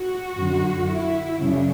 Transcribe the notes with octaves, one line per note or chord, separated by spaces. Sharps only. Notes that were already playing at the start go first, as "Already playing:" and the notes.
Already playing: F#4
F#2 D3
E4
F#2 C#3 D4